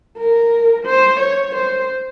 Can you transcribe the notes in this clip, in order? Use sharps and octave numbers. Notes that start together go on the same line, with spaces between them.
A#4
C5
C#5
C5